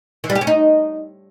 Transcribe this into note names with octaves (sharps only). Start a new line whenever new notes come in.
E3
G3
G4
C#4
D#4